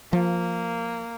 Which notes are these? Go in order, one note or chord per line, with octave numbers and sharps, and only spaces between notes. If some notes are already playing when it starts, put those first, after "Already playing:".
F3 A#3